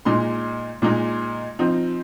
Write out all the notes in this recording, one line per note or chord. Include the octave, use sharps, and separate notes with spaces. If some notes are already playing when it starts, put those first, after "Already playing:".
A#2 G#3 D#4 C6
A#2 G#3 D#4
F3 C4 D#4